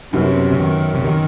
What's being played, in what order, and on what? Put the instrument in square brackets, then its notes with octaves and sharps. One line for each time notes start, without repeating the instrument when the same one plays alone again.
[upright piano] F#2 F#3 B3 [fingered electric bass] C3
[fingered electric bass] C3
D#3
C3
D#3